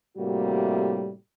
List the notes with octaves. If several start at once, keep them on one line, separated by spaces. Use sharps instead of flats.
A2 C3 G3 A#3 F#4